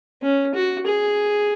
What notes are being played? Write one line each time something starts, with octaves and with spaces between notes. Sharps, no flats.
C#4
F#4
G#4